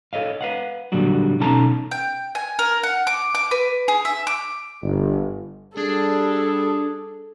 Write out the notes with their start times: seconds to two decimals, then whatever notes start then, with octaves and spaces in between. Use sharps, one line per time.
0.13 A4 C#5 D#5 F5
0.41 B4 F5 F#5
0.92 A#2 D3 F#3 G3 F#4
1.40 B2 C#4 D#4 A4 A5 A#5
1.91 G5
2.35 G#5
2.59 A#4
2.83 F#5
3.07 D6
3.35 D6
3.51 B4
3.88 G#4
4.05 E5
4.27 D6
4.82 G1
5.77 G3 D4 G#4 A4